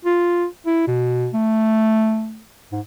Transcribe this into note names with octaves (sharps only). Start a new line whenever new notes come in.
F4
E4
B2
A3
G#2